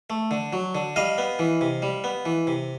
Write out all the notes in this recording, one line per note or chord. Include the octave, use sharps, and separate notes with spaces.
A3
D3
F#3
D3
G3 D#5 F5
B3
E3
C3
G3
B3
E3
C3